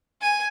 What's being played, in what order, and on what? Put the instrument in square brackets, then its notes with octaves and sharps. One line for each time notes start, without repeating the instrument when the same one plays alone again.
[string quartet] G#5